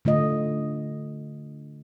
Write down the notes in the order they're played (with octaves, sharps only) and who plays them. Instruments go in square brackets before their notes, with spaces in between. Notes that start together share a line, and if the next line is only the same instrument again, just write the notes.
[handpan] D3 A3 F4 D#5